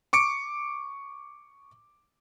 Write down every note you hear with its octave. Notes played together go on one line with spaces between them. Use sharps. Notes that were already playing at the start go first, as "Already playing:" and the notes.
C#6 D6 C#7 D7